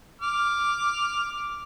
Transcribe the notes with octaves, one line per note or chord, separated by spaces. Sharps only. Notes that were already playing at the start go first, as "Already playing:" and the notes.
D6 F6